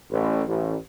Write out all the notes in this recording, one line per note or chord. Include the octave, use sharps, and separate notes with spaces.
A1
A1